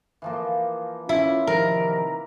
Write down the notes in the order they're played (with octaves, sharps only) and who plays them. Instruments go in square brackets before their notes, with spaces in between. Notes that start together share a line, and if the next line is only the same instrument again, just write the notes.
[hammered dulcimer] E3 F3 A#3
[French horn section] C#4 F4 [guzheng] E4
[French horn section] C3 D#3 F3 [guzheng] A#4